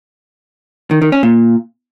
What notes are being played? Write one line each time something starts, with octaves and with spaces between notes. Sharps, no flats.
D#3
D#3
C#4
A#2